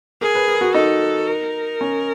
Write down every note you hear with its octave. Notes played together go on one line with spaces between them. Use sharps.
G#4 A#4
B4
A#4
F#4
D#4 A4
A#4
C#4